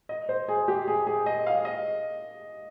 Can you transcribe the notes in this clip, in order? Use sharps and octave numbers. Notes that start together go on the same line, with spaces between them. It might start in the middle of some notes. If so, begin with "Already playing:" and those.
D#5
C5
G#4
G4
G#4
G#4
D#5
F5
D#5